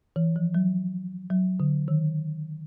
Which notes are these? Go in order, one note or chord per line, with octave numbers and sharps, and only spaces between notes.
E3
F3
F#3
F#3
D3
D#3